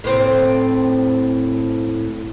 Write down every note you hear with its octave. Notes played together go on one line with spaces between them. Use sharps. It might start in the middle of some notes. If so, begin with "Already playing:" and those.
A2 C4